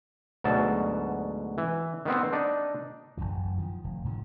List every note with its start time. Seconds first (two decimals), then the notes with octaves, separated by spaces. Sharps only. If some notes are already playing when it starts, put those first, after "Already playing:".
0.44 D2 G#2 B2 F#3 A5
1.58 E3
2.05 D#3 B3 C4
2.33 D4 D#4 D5
3.17 F1 B1 F#2 E3
3.58 D#3 F3
3.84 F1
4.04 G#2 D3 E3 F3